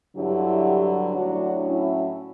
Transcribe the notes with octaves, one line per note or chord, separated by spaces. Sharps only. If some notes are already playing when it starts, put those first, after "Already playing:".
G2 D3 F#3 E4 G4
A2 F#3 D4 F#4
C#4 E4